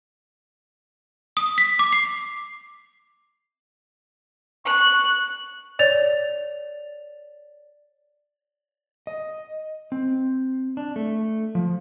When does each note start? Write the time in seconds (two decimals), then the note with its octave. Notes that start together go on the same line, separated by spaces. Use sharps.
1.37 D#6
1.58 B6
1.79 D6
1.92 C7
4.66 C#6 F#6
5.79 C#5 D5 A6 F7
9.07 D#5
9.92 C4
10.77 D4
10.96 A3
11.55 F3